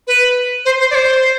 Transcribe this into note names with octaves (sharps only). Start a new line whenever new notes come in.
B4
C5
C5
D5
C5